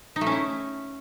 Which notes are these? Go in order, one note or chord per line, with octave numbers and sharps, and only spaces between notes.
D#4
A3
C#4
E4